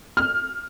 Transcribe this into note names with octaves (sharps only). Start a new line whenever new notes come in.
F6